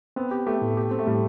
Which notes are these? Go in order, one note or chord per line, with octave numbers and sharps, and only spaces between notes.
B3 C4
G4
A3 G4
A2
G4
C4
A3
A2 G3